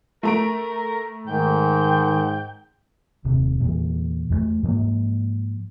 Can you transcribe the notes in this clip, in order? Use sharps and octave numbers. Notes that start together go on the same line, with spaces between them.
A3 A#4 A#5 D7
G#2 D#3 G5
D#1 D#2 C3
E2 A#2
E2 G3 A3
G#2 F3 A#3